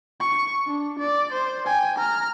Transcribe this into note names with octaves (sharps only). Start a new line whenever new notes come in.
C#6
D4
D5
C5
G5 G#5
A#5 F6